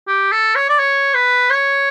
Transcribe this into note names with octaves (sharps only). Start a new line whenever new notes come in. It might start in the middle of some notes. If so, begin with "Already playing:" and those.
G4
A4
C#5
D5
C#5
B4
C#5